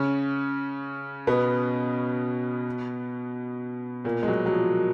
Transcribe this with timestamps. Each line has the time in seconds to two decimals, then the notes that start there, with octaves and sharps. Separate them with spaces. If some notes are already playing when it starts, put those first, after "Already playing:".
Already playing: C#3 C#4
1.27 B2 B3
4.04 A#2 A#3
4.23 G#3
4.28 F#3
4.46 F#3
4.52 F3